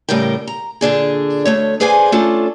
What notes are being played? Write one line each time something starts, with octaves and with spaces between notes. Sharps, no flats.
A2 C#3 G3 A#4 G5
A#5
A#2 D3 D4 G#4
D2 A3 C#5
G#4 B4 C5 D5 F5 G#5
A3 C#4 D4 F4 A4